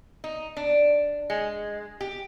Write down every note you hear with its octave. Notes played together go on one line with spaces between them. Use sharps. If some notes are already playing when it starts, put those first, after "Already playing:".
D#4
D4
G#3
G4